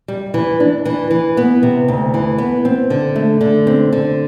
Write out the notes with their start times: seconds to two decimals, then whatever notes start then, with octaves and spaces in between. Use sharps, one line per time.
0.08 G3
0.34 E3
0.60 D4
0.86 E3
1.11 E3
1.37 B3
1.63 C3
1.88 D2
2.14 E3
2.38 B3
2.65 C4
2.90 D3
3.16 A3
3.41 D3
3.67 C4
3.93 D3